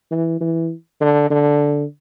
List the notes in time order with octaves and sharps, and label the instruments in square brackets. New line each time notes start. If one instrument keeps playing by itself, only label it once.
[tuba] E3
E3
D3
D3